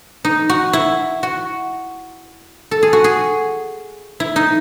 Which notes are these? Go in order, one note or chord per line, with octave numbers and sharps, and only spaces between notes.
D#4
F#4
E4
F#4
A4
G#4
F#4
G#4
E4
D#4